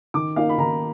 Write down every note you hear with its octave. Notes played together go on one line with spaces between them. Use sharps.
D#3 D6
A#3 D#4 F5
B5
D#3 A#5